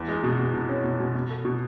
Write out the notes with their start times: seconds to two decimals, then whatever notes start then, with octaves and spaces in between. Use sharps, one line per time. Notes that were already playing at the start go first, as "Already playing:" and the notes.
Already playing: E2
0.08 G#3
0.24 B2
0.39 B2
0.54 B2
0.69 C#4
0.84 B2
1.00 B2
1.15 B2
1.30 A4
1.45 B2